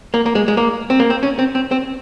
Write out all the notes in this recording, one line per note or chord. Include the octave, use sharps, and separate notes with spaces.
A#3
A#3
G#3
G#3
A#3
C4
A#3
C4
C#4
C4
C4
C4